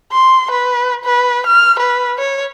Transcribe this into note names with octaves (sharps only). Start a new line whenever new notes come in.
C6
B4
B4
F6
B4
C#5